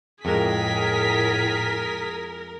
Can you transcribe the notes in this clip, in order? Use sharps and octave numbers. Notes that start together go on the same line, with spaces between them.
F2 A2 G#3 G#4 A#4 B6